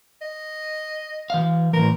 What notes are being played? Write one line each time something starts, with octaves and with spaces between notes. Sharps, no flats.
D#5
E3 F5
A2 E3 A#4